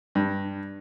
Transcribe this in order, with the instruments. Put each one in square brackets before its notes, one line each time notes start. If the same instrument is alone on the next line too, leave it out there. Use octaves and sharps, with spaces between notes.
[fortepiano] G2